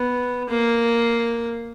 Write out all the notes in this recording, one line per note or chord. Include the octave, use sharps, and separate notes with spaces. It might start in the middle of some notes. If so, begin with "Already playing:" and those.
Already playing: B3
A#3